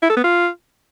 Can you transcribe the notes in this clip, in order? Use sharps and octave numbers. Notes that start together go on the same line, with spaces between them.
E4
A4
B3
F4